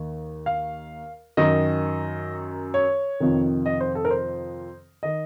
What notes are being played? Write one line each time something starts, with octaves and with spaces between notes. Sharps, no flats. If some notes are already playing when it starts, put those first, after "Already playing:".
Already playing: D#2 D#3
F5
F#2 D#3 D#5
C#5
F2 C3 D#3
D#5
C5
A4
A#4
C5
D#3 D#5